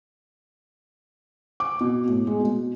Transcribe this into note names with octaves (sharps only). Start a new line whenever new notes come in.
D6
B2
A2
G#3
B2